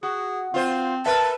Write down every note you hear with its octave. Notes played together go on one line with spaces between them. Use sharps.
F#4 G#4
C4 F4 C5
A#4 B4 E5 A5